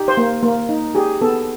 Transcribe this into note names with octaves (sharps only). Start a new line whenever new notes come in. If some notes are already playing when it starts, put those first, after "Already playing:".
Already playing: D#4 G4
C5
A#3
A#3
D#4
G4 G#4
B3 A4